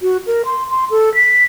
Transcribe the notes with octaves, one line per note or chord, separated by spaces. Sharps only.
F#4
A#4
C6
C6
A4
B6